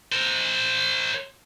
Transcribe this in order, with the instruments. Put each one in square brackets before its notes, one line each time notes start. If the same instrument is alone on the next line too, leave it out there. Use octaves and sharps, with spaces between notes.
[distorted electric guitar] A#4 C5